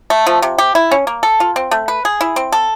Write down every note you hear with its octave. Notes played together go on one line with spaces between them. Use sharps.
A3
F3
C3
G4
E4
C#4
A#3
A4
F4
C4
A3
B4
G#4
E4
C4
A4